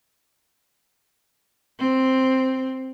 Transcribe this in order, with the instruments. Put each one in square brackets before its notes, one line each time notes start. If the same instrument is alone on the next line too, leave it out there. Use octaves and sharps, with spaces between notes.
[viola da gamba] C4